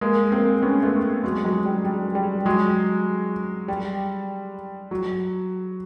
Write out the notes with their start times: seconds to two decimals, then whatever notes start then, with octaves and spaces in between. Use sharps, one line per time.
0.01 G#3 A#3
0.32 A#3 C4
0.62 B3 C#4
0.83 A3 B3
1.23 F#3 G#3
1.44 F#3 G#3
1.65 G3
1.84 G3
2.15 G3
2.46 F#3 G#3
3.68 G3
4.91 F#3